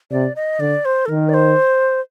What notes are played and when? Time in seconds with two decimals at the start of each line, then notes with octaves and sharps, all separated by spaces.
0.11 C3 D5
0.36 D#5
0.60 D3 D5
0.85 C5
1.06 A4
1.09 D#3 A#4
1.29 D5
1.34 C5